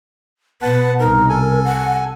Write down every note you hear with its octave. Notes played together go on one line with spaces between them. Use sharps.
B2 B3 B4 F#5 A5
C2 D#4 A#4
A4 G#5
F#5